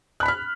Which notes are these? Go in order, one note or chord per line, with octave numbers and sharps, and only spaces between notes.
B5 F6 F#6 B6